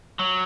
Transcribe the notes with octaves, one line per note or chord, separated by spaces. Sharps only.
F#3